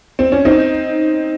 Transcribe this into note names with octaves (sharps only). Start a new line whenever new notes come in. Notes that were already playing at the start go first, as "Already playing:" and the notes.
C4
C#4
C4 D#4